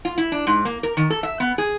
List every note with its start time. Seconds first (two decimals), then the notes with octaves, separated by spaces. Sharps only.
0.05 F4
0.18 E4
0.32 D4
0.47 G#2
0.65 A#3
0.83 A#4
0.97 D#3
1.10 A4
1.23 E5
1.40 B3
1.58 G#4